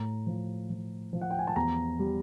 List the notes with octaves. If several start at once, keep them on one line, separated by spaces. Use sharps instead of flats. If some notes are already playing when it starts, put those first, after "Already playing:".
Already playing: A2 A#5
F3
F3
F3
F#5
G5
G#5
A5
E2 A#5
G3